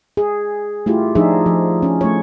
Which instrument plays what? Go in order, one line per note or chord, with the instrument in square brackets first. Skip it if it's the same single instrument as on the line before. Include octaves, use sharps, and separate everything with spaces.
[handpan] G#4
A3 E4 F4 G4
F3 D4 D#4 G#4 E5
F3
C#4
A3 C#5